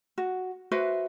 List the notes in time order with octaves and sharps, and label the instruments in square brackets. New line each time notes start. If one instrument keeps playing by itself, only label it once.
[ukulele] F#4
F#4 B4 C5 E5